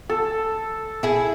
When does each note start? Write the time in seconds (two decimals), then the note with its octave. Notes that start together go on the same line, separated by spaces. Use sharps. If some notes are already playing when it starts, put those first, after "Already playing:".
0.09 A4
1.03 E4 G#4